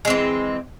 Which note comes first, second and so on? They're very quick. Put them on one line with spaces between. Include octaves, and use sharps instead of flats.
G#3 C4 E3